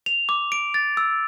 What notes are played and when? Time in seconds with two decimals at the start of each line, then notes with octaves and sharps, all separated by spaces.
0.06 F7
0.29 D6
0.52 D7
0.74 A6
0.97 E6